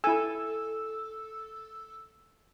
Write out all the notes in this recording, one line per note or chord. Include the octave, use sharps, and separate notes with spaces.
E4 A4 G#5 E6